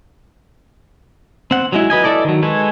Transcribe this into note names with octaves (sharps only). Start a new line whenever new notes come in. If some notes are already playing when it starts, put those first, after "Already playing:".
C4 F#5
F#3 G#3 E4
F#3 B4 D#5 G#5
E4 A4 D5 D#5
D#3 F#3
G#3 A4 B4 C#5